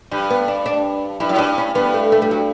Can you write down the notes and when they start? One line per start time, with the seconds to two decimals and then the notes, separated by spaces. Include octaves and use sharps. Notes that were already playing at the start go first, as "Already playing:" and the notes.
0.11 G2 G3
0.30 B3
0.48 D4
0.66 D4
1.20 G2 E4
1.29 F#2
1.36 G2 D4
1.58 C#4
1.75 G2 B3
1.94 A3
2.12 A3
2.22 G3
2.31 F#3